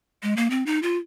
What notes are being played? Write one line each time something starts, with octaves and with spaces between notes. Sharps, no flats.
G#3
A#3
C4
D#4
F4